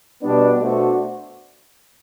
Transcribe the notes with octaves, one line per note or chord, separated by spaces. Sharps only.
B2 G3 B3 D4
B2 A3 D4 F#4 C5